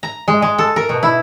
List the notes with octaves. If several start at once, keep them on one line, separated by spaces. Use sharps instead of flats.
A#5
G#3
G#3
A4
A#4
B2
E4